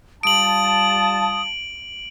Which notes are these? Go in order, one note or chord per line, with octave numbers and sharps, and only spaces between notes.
G3 F4 A5 D#6 D7 F#7